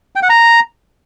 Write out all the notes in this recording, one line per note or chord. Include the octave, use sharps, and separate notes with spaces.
G5
F#5
A#5